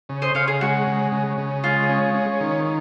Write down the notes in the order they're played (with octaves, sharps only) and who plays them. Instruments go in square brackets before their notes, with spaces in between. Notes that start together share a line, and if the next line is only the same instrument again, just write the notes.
[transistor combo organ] C#3
[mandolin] C5 D#5
[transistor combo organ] C#3 [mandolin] C#5 F5
[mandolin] G#4
[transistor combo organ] G#3 [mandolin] F#4
[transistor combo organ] C#3
C#3
C#3
[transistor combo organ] G#3 [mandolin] F4
[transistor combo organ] C#4
C#4
D#3